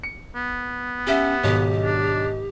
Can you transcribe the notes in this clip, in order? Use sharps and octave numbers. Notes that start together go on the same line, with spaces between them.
C#7
B3
C#4 G4 E5 F#5
B1 G#2 D#3 G4 D#5
D4